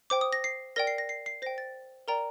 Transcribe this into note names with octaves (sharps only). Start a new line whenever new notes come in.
C5 G5 D6
D#6
A#6
C7
A#4 D5 G5 A#6
C7
A#6
C7
C7
C5 G5 A#6
A6
A#4 D5 G5 A#5